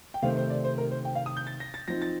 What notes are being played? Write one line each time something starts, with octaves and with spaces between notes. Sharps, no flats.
G5
C3 D#3 A3 C4 D#4 F5
C5
D5
C5
A#4
C5
G5
F5
D#6
G6
A6
A#6
A6
F3 C4 D#4 A#6
A6